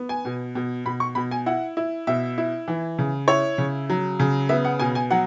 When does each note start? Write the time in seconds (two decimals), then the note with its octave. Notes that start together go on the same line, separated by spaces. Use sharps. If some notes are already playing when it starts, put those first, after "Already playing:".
Already playing: B3
0.09 G#5
0.25 B2
0.55 B2
0.85 B2 B5
1.00 C#6
1.15 B2 B5
1.31 G#5
1.46 E4 F#5
1.77 E4
2.07 B2 E5
2.38 E4
2.68 E3
2.98 C#3
3.28 E4 C#5
3.58 C#3
3.90 F#3
4.19 C#3
4.49 B3 E5
4.65 F#5
4.80 B2 G#5
4.95 G#5
5.11 F#3 F#5